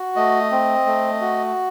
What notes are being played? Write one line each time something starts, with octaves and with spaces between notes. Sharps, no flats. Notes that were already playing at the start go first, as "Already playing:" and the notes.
Already playing: F#4
A3 D#5
C4
A3
F#4